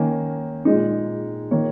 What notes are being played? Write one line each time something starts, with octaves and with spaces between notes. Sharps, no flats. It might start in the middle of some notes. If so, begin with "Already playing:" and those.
Already playing: D#3 A#3 C#4 G#5
A#2 G#3 D#4
D#3 A#3 C#5